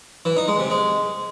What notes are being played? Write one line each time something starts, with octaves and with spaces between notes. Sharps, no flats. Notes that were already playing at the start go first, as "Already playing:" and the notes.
E3
D#4
G#3
C3
G#3